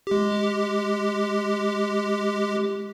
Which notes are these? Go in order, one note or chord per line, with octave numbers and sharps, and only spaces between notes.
G#3 G4